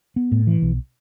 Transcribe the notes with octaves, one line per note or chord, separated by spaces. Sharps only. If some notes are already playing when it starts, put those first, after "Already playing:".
B3
A2
E3
B1